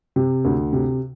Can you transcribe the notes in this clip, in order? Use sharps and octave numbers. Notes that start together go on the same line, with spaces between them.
C3
D2
C3